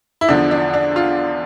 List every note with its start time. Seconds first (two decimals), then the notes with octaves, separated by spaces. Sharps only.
0.21 E4
0.28 E2 D3 F3 D4
0.51 D4
0.74 D4
0.96 F4